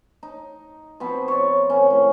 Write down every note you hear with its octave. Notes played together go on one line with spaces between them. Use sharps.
D#4
B2 F3 C4 B5
C#5 D5
C3 D#3 C#4
A2